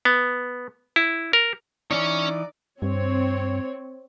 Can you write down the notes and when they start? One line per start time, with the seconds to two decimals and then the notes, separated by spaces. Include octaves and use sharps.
0.05 B3
0.96 E4
1.33 A#4
1.91 E3 C#4 D#4 C#5 D5
2.82 G2 C4 C#5